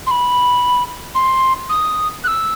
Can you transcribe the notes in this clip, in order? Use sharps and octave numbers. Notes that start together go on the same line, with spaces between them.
C6
B5
C6
D#6
F#6
E6